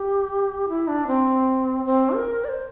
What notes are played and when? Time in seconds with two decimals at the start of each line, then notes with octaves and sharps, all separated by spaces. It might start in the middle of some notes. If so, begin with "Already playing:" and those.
Already playing: G4
0.69 E4
0.88 D4
1.07 C4
1.86 C4
2.15 A#4
2.45 D5
2.49 C5